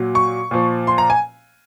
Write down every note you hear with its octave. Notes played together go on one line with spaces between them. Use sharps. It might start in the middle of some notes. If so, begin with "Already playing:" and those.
Already playing: A#2 F#3
C#6
A#2 F3
C6
A#5
G#5